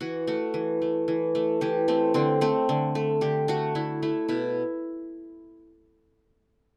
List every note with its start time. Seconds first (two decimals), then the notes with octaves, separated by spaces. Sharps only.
0.01 E3 F#4
0.27 A3 F#4
0.54 E3
0.82 A3
1.08 E3
1.35 A3
1.61 E3 G4
1.88 A3 C4
2.14 D3 C4
2.41 A3 C4
2.69 D3
2.95 A3
3.21 D3 G4
3.48 A3 F#4
3.75 D3 E4
4.02 A3 E4
4.28 B2 E4